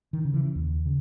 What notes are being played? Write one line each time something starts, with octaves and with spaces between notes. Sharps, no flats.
D#3
C#3
E3
D#2
C#3